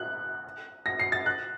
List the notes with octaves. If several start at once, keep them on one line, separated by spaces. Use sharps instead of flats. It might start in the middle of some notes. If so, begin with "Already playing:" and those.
Already playing: F#6
A#6
C7
A6
F#6